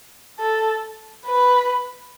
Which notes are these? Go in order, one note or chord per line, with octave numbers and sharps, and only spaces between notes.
A4
B4